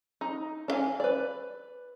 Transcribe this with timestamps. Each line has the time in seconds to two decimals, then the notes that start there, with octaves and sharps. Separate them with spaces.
0.21 D#4
0.68 D4 F5 G#5
1.00 B4 D5